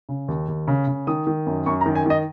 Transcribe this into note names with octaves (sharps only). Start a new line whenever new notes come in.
C#3
D#2
D#2
C#3
C#3
D#3 D#6
D#3
F#2
F#2 C#6
A#5
D#3
G#5
D#3 D#5